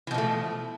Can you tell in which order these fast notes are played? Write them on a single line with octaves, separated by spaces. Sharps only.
E3 B2 F3 A3